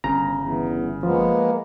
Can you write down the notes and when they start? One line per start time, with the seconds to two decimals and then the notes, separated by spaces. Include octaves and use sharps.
0.04 G1 C#3 A#5
0.36 E2
1.03 F3 G#3 A#3 B3